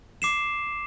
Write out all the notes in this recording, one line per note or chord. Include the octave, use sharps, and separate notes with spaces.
D6 C7 E7